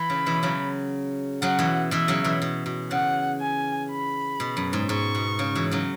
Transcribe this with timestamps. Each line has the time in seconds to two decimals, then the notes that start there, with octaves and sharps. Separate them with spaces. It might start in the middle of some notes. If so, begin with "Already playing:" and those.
Already playing: E3 B5
0.10 C#3
0.26 B2 E3
0.43 C#3 F#3
1.42 C#3 F#3 F#5
1.59 B2 E3
1.91 B2 E3 E5
2.08 C#3 F#3
2.24 B2 E3
2.42 B2
2.66 B2
2.90 C#3 F#5
3.41 G#5
3.91 B5
4.40 B2
4.57 F#2
4.73 G#2
4.89 G#2 C#6
5.15 B2
5.39 C#3
5.55 B2 E3
5.71 C#3 F#3